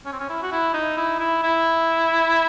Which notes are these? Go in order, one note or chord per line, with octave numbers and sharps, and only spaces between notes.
C#4
C4
C#4
E4
F#4
E4
D#4
E4
E4
E4